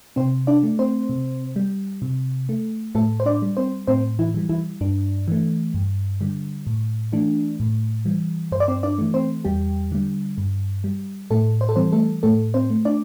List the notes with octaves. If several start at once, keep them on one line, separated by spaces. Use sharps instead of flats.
C3 C4 C5
D4 D5
A3
C4 C5
C3
G3
C3
A3
A2 A3 A4
C5
D4 D5
G3
C4 C5
A2 C4 C5
E3 E4
E3 G3
E3 E4
G2 D4
E3 A3
G2
D3 G3
A2
E3 A3 D4
A2
E3 G3
G2 C5
D5
C4 C5
D4 D5
E3 A3
C4 C5
E2 G3 G4
D3 G3
G2
G3
A2 A3 A4
C5
A4
E3 G3 C4 C5
A3 A4
A2 A3 A4
C4 C5
A3
D4 D5